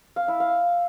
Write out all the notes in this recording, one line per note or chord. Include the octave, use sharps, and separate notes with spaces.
F5
E4
F5